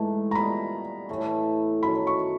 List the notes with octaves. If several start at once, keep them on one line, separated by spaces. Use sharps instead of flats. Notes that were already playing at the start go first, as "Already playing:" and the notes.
Already playing: G#2 E3 A3
A#5
A#2 G3 B3 B5
A2 E3 A3
F#2 D#3 F#3 B5
C#6